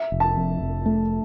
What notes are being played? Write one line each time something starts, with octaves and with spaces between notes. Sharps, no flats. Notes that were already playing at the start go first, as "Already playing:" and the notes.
Already playing: E5
F1
A5
F2
F1
A3